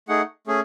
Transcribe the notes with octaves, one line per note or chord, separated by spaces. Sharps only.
A3 D#4 G#4 F#5
A3 C#4 G#4